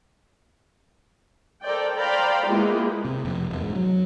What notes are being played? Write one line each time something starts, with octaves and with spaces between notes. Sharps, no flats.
A4 A#4 C5 D5 G5
C5 D5 F5 G5 A#5 B5
G#3 A#3 B3 E4 F4 G4
C3
F1
E1
G#2
F#3